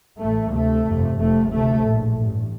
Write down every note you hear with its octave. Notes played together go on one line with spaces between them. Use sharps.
A1 A2 A3
D2 C3 A3
G1 F2 C3
F1 F2 C3 A3
D2 C3 A3
A#1 A2
A1 G2